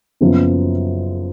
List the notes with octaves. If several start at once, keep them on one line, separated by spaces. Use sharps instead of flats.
F#1 F#2 F3 B3 F4